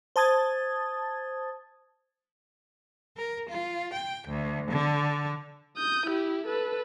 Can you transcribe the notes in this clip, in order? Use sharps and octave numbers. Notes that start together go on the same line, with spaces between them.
C5 A5 D#6 G#6 A6
A#4
F4
G5
D2
D3
D#6 G6
E4 G4
A4 B4